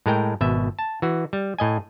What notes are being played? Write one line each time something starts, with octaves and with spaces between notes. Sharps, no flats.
A2 G#3 A#4 G5
G#1 B2 E5
A5
E3 F#4
G3
A2 D#5 G#5